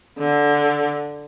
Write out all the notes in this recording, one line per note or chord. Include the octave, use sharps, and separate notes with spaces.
D3